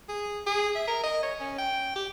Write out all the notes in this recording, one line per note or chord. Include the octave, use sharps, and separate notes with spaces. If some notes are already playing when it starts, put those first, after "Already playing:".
G#4
G#4
E5
A#4
D#5
C#5
C#4
G5
G4